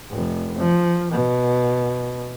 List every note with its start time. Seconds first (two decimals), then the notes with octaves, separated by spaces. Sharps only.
0.10 F1
0.58 F3
1.11 B2